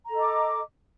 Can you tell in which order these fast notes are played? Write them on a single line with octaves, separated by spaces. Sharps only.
A#5 A4 D#5 D6